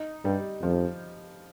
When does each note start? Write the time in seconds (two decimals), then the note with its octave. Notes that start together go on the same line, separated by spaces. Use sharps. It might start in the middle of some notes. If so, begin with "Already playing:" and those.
Already playing: D#4
0.25 G2 G3
0.63 F2 F3